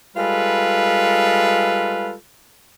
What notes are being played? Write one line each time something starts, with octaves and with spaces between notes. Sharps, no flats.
G3 G#3 F4 A4 B4